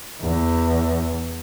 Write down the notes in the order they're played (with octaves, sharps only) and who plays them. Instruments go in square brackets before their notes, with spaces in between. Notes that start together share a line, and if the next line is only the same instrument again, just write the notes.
[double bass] E2